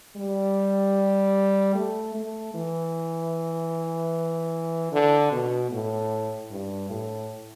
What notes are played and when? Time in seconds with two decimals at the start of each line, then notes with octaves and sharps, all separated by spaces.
0.17 G3
1.75 A3
2.15 A3
2.54 E3
4.92 D3
5.32 B2
5.71 A2
6.51 G2
6.90 A2